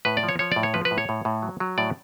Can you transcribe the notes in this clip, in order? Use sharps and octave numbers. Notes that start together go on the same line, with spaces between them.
A2 B4
D5
F3
C#5
F3 C#5
A2 D5
C#5
F3 B4
B4
A2
C#5
A2
A2
F#3
F#3
A2 D5